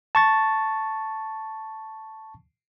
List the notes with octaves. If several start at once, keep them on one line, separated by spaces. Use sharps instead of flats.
A5 C#6 A6